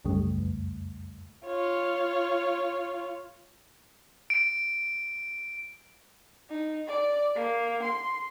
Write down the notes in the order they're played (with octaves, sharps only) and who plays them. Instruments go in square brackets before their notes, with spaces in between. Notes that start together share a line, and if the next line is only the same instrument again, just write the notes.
[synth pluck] C2 F#2 C#3 G3 A3
F2
[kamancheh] F4 C#5
[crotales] D7
[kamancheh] D#4
D5
A#3
C6